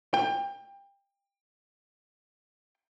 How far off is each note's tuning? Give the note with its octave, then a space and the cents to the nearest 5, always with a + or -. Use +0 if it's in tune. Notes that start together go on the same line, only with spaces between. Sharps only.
G5 +25